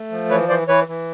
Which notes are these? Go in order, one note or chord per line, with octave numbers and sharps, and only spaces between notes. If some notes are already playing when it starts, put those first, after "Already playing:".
Already playing: A3
F3
E3 B4 C#5
E3 C5 D5
E3 B4 C#5
E3